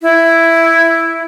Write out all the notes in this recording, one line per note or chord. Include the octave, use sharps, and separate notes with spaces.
E4